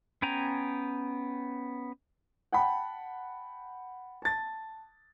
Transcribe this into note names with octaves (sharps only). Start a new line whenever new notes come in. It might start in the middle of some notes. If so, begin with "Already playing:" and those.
B3 C#4 G5 G#5 A#5
F#5 G5 A5 B5
A5 A6